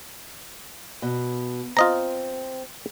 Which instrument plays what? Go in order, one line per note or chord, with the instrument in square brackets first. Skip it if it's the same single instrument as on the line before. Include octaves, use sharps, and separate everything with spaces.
[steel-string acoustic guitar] B2
[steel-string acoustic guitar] C4 [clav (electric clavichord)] F4 D#5 A#5